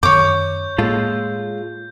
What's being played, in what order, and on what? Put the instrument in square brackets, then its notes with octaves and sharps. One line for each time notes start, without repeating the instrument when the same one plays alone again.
[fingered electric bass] F#2 D#3 [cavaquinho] C#5 D6 [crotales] G6
[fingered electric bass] A2 A#3 [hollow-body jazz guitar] G#3 F4 A4